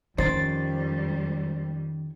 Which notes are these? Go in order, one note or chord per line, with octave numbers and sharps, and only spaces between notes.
F2 D#3 G3 C#4 C5 A6